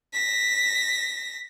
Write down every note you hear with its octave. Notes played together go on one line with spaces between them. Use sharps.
A#6 B6